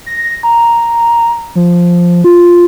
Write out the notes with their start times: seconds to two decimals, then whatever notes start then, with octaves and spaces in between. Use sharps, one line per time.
0.06 A#6
0.43 A#5
1.55 F3
2.24 F4